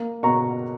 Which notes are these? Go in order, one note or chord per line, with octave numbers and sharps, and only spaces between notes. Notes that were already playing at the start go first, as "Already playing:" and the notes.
Already playing: A#3
B2 A#5 C#6